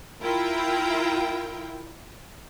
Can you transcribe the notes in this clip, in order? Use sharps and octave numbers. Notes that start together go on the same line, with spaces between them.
E4 F4 A#4 G5